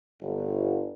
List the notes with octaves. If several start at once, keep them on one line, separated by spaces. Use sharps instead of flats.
G1